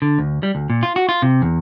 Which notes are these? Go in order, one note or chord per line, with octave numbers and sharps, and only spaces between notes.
D3
D2
G3
D2
A#2
F4
F#4
F4
C3
E2